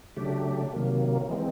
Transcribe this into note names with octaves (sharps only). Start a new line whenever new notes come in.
C#3 F#3 A3 D4 G4
C3 D#3 F#3 A#3
E3 G#3 C4